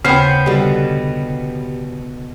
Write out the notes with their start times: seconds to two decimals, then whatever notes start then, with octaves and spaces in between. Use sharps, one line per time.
0.05 D#2 C#3 B3 C#4 C5 C7
0.46 B2 D3 G3